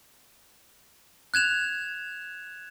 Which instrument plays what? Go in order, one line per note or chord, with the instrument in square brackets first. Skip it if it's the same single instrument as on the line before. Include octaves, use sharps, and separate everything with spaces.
[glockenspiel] F#6 G#6 E7 F7